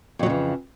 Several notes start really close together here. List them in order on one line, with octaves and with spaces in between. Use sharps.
F2 F#3 C#3 E3